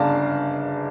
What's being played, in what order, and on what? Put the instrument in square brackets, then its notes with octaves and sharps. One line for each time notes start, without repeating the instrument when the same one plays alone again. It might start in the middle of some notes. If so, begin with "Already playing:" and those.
Already playing: [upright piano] G1 C#3 D5 F5 A5 A#5